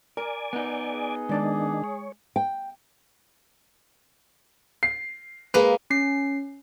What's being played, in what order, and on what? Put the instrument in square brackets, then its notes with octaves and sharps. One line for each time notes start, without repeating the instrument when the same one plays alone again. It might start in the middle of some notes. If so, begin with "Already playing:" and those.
[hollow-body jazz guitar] A#4 [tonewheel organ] D5 G#5
[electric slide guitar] B3 D#4
[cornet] G#4
[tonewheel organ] D#3 D4 [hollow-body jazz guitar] G#3 D5 A5
[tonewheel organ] C#5
[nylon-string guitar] G5
[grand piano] C7
[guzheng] G#3 A#3 [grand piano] B4
[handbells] C#4 C7